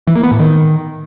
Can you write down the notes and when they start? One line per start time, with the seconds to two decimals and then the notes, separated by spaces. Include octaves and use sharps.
0.07 E3
0.15 A#3
0.23 B3
0.31 A2
0.39 D#3